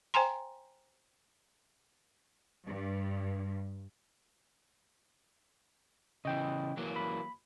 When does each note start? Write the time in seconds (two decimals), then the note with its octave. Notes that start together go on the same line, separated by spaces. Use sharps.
0.14 C5 G5 G#5 A#5 C6
2.66 G2
6.25 C#3 E3 D#5 G5
6.77 E3 F#3 A#3
6.96 B5